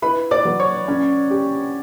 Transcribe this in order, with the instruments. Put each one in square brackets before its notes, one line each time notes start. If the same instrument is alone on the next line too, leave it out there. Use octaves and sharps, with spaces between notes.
[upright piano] E4 [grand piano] B4 B5
[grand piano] D5 D6
[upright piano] F#3
[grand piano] C#5 C#6
[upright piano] C#4
G4